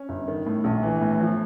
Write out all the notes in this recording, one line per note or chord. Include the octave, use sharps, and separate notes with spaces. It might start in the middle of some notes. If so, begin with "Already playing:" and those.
Already playing: C#4
G1
D#3
A2
A#1
E3
A2
F3